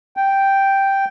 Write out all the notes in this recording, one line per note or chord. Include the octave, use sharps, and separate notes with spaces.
G5